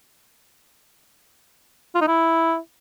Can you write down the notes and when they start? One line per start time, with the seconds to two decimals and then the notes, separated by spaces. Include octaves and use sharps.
1.95 F4
2.01 D#4
2.08 E4